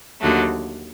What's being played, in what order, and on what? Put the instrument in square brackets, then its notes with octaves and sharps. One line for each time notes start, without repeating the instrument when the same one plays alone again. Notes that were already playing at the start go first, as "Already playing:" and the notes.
[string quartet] D#2 D3 F#3 A3